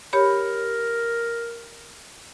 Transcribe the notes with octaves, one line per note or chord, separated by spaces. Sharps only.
G4 A#4 C#5 B5